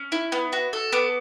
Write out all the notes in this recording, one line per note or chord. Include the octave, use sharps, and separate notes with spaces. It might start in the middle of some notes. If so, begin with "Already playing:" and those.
Already playing: C#4
E4
B3
F#4
A4
B3 D6